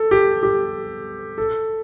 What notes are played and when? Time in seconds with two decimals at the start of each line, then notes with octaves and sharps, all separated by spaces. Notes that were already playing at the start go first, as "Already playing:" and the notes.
Already playing: A4
0.11 G4
0.43 G4
1.38 A4